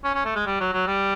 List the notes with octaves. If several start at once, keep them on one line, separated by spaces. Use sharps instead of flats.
C#4
C#4
A3
G#3
G3
F#3
F#3
G3